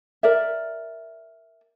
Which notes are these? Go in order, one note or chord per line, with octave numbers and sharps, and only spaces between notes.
A#4 D5 E5